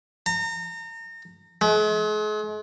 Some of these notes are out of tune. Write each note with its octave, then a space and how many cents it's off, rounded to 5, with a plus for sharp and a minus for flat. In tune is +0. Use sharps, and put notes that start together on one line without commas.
A#5 -35
G#3 +40